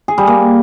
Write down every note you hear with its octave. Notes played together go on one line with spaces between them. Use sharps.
G#4
G3
A#3